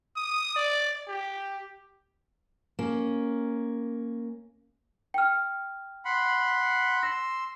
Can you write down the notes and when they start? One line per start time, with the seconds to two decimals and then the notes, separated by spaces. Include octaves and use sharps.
0.16 D#6
0.56 D5
1.08 G4
2.79 A#3 C#4
5.14 G5 F6
6.05 F#5 B5 C6
7.03 C6 E6 A#6